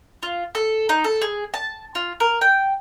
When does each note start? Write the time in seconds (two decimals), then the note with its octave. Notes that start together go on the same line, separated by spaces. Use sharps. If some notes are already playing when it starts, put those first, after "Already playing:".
0.23 F4
0.55 A4
0.89 D#4
1.04 A4
1.22 G#4
1.54 A5
1.95 F4
2.20 A#4
2.41 G5